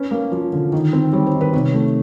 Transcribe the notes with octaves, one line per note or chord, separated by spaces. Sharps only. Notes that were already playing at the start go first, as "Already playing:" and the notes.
Already playing: C#4 B4
A#3
F3
D3
D#3
C4
G3 C#5
C5
D#3
B4
C3 C#5
A3